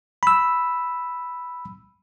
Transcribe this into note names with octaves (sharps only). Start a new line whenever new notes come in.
B5 E6